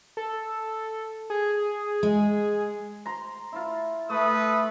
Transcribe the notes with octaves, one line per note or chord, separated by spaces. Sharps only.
A4
G#4
G#3
A#5 C6
E4 F4
A3 A4 B4 D#6